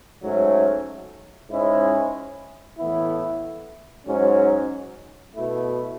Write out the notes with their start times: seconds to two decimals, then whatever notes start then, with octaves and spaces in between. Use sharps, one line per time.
0.22 G#2 F#3 A3 C#4
1.50 G#2 G#3 C#4 E4
2.78 A2 E3 B3 E4
4.06 G#2 F#3 C#4
5.34 B2 A3 E4